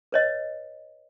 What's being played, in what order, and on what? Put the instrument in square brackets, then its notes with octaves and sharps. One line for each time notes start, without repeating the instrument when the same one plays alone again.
[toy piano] B4 C#5 D#5